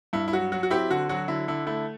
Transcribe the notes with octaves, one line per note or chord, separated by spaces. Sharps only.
G2 E4
E4
F#3 F#4
F#3 F#4
F#4
C4 E4 G4
D3 F#4
F#3 F#4
D3 E4
D3 E4
A3 E4